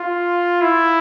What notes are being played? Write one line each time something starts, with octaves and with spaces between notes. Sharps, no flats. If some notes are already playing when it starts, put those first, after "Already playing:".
Already playing: F4
E4